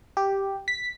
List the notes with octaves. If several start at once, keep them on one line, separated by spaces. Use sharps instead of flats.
G4
B6